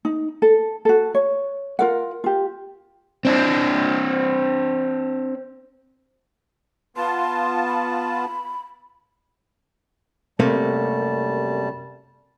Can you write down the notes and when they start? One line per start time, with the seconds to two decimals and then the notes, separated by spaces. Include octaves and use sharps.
0.05 D#4
0.42 A4
0.85 F#4 A4
1.15 C#5
1.79 F4 A#4 F#5
2.24 F4 G4
3.25 C4 D4
6.97 B3 F4 A5 C6
7.67 B5
10.40 F#2 C3 G3 A3 A#3 A5